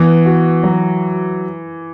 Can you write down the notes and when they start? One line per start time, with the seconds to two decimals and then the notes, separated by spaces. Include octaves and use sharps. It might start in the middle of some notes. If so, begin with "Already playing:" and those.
Already playing: E3 B3
0.26 F#4
0.63 F#3